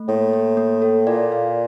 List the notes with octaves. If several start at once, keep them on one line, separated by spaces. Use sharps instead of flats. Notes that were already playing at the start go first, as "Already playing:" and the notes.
Already playing: A3
A2 A#3
A#3
A#3
A4
A#2 D5
F5